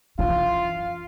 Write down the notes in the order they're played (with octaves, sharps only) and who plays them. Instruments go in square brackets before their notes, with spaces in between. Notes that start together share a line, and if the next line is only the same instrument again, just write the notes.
[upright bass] F#2 E3 [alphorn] F4 [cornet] F5